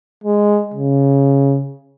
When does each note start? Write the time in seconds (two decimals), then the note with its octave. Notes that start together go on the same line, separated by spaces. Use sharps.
0.24 G#3
0.74 C#3